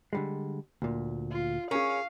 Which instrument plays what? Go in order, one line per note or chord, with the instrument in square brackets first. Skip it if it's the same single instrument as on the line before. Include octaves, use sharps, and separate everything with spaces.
[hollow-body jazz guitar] D3 G3 G#3
D2 A#2
[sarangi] F4
[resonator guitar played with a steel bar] C#4 [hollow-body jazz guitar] G#4 A#4 [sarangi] F5